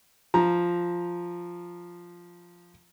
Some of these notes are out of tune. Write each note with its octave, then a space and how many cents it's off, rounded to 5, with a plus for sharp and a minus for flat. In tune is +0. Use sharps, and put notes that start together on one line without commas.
F3 +0 A#5 +0